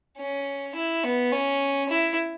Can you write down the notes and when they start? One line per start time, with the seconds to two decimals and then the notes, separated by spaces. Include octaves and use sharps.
0.18 C#4
0.75 E4
1.04 B3
1.32 C#4
1.89 E4